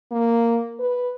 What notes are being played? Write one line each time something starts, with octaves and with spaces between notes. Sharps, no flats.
A#3
B4